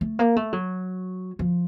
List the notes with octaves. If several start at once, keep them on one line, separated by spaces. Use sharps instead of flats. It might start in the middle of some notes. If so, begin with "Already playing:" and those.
A3
A#3
A3
F#3
F3